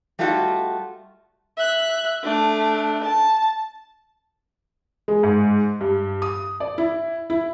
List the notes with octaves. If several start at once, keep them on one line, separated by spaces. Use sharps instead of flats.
G3 A3 D#4 F4 F#4 A4
E5 F#6
A3 D4
A5
G#3
G#2
G2
D#6
D5
E4
E4